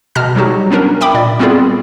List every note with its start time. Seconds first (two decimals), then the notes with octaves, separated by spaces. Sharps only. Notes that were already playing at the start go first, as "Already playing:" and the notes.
0.15 B2 A5 A#5 F6 A#6
0.35 F#3 G3 D#4 F#4 G4
0.71 B3 C#4 D4 A#4
1.01 E5 G5 B5 D6
1.14 A#2 D5
1.39 G3 B3 C4 E4 F4 G#4